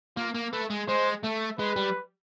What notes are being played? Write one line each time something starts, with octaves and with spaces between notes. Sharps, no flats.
A#3 F4
A#3
A3 B4
G#3
G#3 C5
A3
G#3 B4
G3